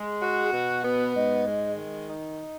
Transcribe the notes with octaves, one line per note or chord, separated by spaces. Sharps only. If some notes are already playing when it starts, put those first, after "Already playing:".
Already playing: G#3
F#4
B2
B3
G#2
G#3
D#3
D#4